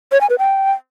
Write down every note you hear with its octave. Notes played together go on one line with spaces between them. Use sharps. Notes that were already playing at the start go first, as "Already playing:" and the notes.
C#5
G#5
B4
G5